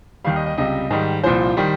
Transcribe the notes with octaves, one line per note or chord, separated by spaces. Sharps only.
D#2 D#3 G3 F5
D#5
D#5
C#2 C3 G3 D#5
G#2 D#3 G3
C2 A#2 F3 C5
D#3 G3